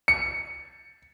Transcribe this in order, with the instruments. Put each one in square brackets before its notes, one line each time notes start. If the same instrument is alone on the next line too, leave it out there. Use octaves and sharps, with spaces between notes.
[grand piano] C#7